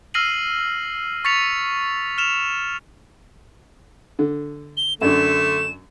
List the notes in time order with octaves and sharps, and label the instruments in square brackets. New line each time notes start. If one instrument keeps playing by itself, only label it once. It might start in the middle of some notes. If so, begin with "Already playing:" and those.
[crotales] E6 F6 A#6 C7 D#7 F#7
C#6 A6 B6 C#7 F7
F6 E7 F7
[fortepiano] D3
[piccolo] G7
[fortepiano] F#2 D4 [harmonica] D3 A3 [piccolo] E7